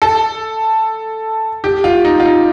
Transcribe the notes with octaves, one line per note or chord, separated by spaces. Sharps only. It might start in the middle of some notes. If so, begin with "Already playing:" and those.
A4
G4
F4
D#4
F4
D#4